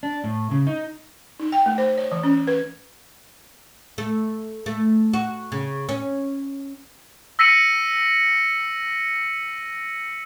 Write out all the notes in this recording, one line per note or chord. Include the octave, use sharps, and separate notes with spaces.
D4
A2
C#3
D#4
D#4
G5
A3
C5
C#5
E3
C#4
B4
A3
A3
F#4
C#3
C#4
E6 A#6 B6 C#7 D#7 F#7